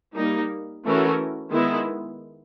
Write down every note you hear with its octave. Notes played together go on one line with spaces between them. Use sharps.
G3 A#3 D#4
E3 A3 C#4 F#4 A#4
D#3 G#3 B3 E4